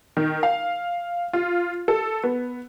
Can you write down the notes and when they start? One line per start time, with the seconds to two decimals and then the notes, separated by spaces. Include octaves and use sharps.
0.17 D#3
0.43 F5
1.33 F4
1.88 A4
2.24 B3